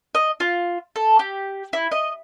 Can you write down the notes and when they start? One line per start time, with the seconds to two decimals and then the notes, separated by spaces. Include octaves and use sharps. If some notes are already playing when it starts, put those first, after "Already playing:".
0.15 D#5
0.40 F4
0.96 A4
1.19 G4
1.73 E4
1.91 D#5